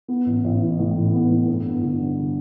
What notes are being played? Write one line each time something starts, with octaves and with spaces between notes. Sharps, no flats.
B3
A1
A1
E3
A2
A1
B3
A2
G2
B3
D3
G3
D3